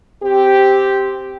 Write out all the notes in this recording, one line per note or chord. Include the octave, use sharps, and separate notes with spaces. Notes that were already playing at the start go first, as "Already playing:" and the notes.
C4 G4